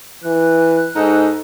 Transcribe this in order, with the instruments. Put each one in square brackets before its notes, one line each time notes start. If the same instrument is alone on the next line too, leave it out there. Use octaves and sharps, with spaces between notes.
[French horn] E3 [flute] F#6
[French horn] G#2 [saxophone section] D#4 A4